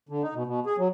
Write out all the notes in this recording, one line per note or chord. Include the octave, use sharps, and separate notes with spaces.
D3
D#4
B2
B2
G#4
F#3